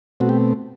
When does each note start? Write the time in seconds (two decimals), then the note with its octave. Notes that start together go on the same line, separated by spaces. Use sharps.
0.20 B2 A3 C4 F#4
0.29 G4